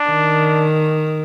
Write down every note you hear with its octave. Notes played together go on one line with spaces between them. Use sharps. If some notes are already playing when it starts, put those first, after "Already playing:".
Already playing: D4
D#3